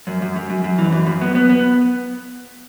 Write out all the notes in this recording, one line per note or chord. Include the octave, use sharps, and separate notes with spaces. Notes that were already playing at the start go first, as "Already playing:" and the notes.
F#2
F#2
F#2
F#2
F#2
E3
F#2
F#2
B3
B3
B3